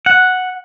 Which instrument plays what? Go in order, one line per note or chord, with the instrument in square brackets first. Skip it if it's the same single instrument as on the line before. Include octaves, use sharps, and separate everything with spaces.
[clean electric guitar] F#5